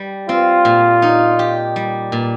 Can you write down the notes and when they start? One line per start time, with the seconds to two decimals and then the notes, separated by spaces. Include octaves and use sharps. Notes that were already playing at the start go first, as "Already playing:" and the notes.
Already playing: G3
0.29 C4 F4
0.65 A#2
1.02 D#4
1.39 G4
1.76 G3
2.12 A#2